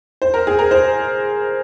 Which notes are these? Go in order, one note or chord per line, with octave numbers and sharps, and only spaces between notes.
C5
A#4
G#4
A#4
C5